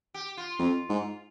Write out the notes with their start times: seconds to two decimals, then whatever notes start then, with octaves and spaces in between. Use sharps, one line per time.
0.14 G4
0.37 F4
0.59 F2
0.89 G#2